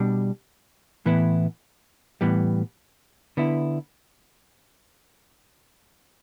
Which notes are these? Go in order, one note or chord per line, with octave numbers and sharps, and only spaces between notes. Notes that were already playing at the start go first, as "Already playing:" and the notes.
Already playing: B2 G3 D4
A2 E3 B3 E4
A2 E3 G3 B3
D3 B3 E4